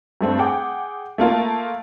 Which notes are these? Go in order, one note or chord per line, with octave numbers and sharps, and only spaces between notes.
G2 A3 C4
G#4 F#5 G5 D6
A3 A#3 F4 A#4